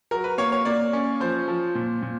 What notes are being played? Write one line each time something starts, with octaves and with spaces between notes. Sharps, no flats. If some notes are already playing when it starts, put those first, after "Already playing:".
F#3 A#4
B4
A#3 C#5
C#5
A#3 D5
C#4
F3 C5
F3
A#2
A#2